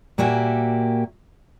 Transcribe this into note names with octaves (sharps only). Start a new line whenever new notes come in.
A#2 A#3 F#4 G4 E5 G#5